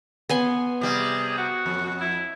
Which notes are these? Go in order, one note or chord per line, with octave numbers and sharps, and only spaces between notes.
B3 G#5 C6
C3 G3 G#4
F#4
F2
E4